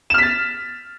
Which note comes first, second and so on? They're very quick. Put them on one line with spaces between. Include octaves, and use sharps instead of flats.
E7 F6 B6 A6